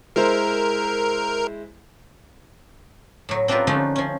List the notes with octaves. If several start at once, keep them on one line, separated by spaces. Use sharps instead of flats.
G#3 E4 A#4 C5
A2 F#3
C4 D4 F4 G4 A#4 B4
D3 F3 A3 C#4 D#4 F#4
F3 C#4